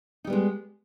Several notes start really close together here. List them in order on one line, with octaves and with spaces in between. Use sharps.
D#4 G3 B3 G#3